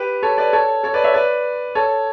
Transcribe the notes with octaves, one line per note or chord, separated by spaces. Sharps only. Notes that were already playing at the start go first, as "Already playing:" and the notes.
Already playing: G4 B4
A4 C#5
B4 D5
A4 C#5
A4 C#5
B4 D5
C#5 E5
B4 D5
A4 C#5